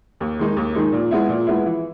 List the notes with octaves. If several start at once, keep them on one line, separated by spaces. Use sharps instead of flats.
D#2
D#3 G#3 D#4
D#2
D#3 G#3 D#4
A#2
G#3 B3 E4
A#2
G#3 B3 E4
E3